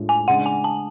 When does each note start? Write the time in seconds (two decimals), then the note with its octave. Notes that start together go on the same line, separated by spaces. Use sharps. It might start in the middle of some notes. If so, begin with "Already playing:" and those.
Already playing: A2 G#3 D4 F4
0.09 G#5
0.28 C#3 G#3 D4 F#5
0.46 G#5
0.64 A5